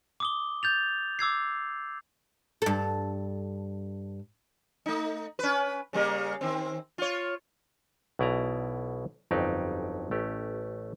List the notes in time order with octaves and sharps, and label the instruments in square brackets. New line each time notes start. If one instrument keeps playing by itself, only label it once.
[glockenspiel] D6 D#6 G7
G6 A6 F7
D6 E6 G#6 C7
[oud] G2 A4
[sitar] A3 D#4
C#4 B4
C#3 G3 A#3
D#3 C4
F4 C#5
[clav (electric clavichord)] B1 B2 E4 D5 G#5 A#5
G1 F2 F#3 D#4 G4 D5
A1 A3 C#4 G4